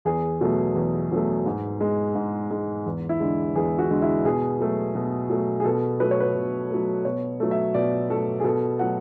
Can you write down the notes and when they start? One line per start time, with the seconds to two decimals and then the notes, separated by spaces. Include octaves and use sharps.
0.05 E2 G#4
0.41 B2 F#3 A3
0.75 E2
1.11 B2 F#3 A3
1.46 G#2
1.81 G#3
2.15 G#2
2.51 G#3
2.86 E2
3.09 E4
3.20 D3 G#3
3.55 E2 G#4
3.79 F#4
3.90 D3 G#3
4.02 E4
4.25 B2 G#4
4.60 F#3 A3
4.95 B2
5.30 F#3 A3
5.60 G#4
5.64 B2 A4
6.00 F#3 A3 B4
6.11 C#5
6.20 B4
6.35 B2
6.71 F#3 A3
7.05 B2 C#5
7.40 F#3 A3
7.51 E5
7.74 B2 D5
8.10 F#3 A3 A4
8.40 G#4
8.44 B2 A4
8.79 F#3 A3 F#5